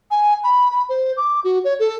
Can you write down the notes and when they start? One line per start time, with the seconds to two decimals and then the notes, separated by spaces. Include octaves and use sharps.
0.11 G#5
0.44 B5
0.71 B5
0.89 C5
1.17 D6
1.44 F#4
1.65 C#5
1.80 A4